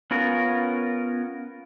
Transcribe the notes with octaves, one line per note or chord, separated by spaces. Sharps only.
B3 C#4 F4 A#4